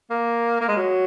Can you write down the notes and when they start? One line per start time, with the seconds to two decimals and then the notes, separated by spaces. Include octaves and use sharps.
0.10 A#3
0.61 A#3
0.68 G#3
0.76 F#3